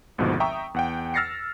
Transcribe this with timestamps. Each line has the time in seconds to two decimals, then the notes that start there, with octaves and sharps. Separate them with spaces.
0.18 G#1 D2 G#2 B2 F3
0.40 E5 G5 A#5 C#6 D#6
0.74 E2 F#5 G5
1.14 E6 F6 A6 A#6 C7 C#7